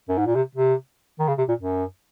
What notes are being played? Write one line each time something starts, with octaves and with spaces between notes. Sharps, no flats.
F#2
G#2
A#2
C3
C3
D#3
C#3
C3
A#2
F#2